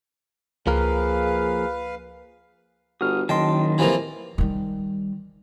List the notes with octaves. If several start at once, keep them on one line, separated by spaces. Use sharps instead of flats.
C#2 F3 A#3 G#4 A#4 B4 F5
G1 F#4 D#6 F6
F#1 D#3 F#3 D#5 G5 A5 C6
C3 E3 F3 A#3
D#3 G3